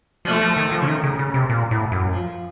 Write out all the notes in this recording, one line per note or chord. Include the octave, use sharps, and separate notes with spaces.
F3 A3
F3
D#3
F3
C#3
D#3
C#3
C#3
C3
A#2
A2
F#2
F3